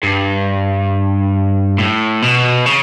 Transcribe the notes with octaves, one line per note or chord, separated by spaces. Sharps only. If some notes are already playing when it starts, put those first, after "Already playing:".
G2
A2
B2
C#3